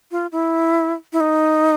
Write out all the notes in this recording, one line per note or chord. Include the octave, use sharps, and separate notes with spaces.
F4
E4
E4
D#4